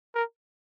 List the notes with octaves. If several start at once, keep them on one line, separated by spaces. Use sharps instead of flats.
A#4